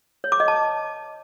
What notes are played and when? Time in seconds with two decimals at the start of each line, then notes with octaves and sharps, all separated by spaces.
0.24 C#5
0.32 D6
0.40 D#5
0.48 A5